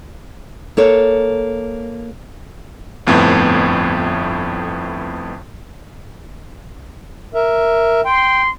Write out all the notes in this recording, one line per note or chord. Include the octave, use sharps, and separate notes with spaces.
A#3 A4 C#5
G1 F2 A2 B3
A#4 E5
G5 C6